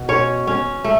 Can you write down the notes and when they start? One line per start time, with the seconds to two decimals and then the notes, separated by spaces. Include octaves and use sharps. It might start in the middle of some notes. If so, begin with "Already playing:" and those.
Already playing: B2
0.09 C#4 C#5
0.47 C#4
0.84 A3